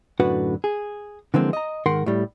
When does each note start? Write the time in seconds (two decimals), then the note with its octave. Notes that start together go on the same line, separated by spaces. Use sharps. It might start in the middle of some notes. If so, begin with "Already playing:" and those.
0.20 F#2 A2 D3 F#4 B4 F#5
0.64 G#4
1.34 D3 E3 F3 G#3 A#3 C4
1.53 D#5 A#5
1.86 G#2 D#3 A#4 F#5 C6
2.06 A2 G3